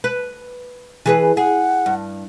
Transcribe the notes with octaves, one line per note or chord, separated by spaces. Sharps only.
B4
E3 G#4 B4
G#4 F#5
G2